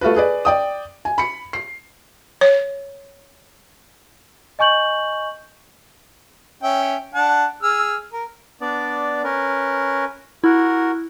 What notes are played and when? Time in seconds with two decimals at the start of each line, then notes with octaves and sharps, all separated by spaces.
0.01 A3 F4 F#4 B4
0.16 G#4 B4 D5
0.45 D5 G5 D#6
1.05 G#5
1.18 B5 C#7
1.53 C7
2.41 C#5
4.59 D#5 G#5 C#6 G6 F#7
6.63 C#4 E5 G5
7.15 D4 F#5 A5
7.63 G#4 E6 F6
8.13 A#4
8.61 B3 D4 D5
9.24 C#4 A#4 B4
10.44 E4 F#4 A#4